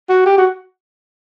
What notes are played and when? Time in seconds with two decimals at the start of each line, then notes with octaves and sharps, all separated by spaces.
0.09 F#4
0.26 G4
0.38 F#4